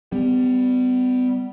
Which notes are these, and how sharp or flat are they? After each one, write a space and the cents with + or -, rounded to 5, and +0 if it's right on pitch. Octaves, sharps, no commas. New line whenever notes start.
G3 +5 B3 +40